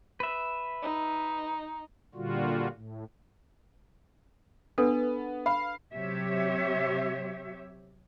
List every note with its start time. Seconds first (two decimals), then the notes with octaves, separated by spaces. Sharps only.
0.20 B4 E5
0.82 D#4
2.15 A#2 D3 G3 F4 F#4
2.73 A2
4.78 B3 D4 A4 B4
5.46 F5 B5
5.93 C3 F#3 G4 C#5 E5